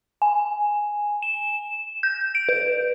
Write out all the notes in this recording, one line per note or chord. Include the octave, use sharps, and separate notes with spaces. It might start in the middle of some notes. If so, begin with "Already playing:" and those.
G#5
E7
G6
D7
B4